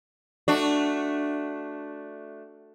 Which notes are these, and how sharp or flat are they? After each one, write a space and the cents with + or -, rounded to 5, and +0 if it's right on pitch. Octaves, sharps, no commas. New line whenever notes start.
A3 +0 D4 +0 F#4 +0